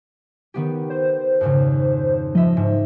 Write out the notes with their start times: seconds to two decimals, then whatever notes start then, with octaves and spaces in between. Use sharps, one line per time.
0.54 D#3 B3 G4
0.90 C5
1.41 F2 G#2 C#3
2.35 F3 D#5 E5
2.57 G#2